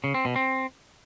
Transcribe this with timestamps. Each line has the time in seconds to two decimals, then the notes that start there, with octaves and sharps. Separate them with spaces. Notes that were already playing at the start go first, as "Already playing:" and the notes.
0.04 C#3
0.14 C4
0.25 B2
0.36 C4